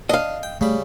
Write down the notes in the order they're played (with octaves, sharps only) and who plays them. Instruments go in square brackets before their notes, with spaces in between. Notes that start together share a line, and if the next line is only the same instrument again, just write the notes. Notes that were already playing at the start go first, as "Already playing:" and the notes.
[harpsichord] D4 [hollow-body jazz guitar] D#5 F5
[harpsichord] G5
[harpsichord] C#3 G3 B5 [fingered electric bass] A3